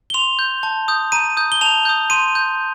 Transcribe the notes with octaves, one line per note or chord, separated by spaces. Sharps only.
G7
C6 F7
G6
A5
D#6 G6
A#5 D#7
D#6 G6
G7
A5 F7
D#6 G6
C6 D#7
G6